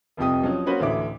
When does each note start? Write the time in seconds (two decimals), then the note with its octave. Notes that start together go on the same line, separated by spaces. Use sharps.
0.17 F1 C2 F3 G4 D#6
0.43 F3 F#3 C#4
0.66 A#3 C#4 F#4 B4 C5
0.80 A1 D2 D3 E4 D6